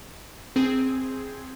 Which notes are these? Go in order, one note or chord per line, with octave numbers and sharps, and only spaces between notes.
C4 G#4